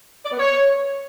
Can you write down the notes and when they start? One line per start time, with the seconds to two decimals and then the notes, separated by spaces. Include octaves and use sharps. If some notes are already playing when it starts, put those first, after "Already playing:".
0.24 D5
0.32 B3
0.39 C#5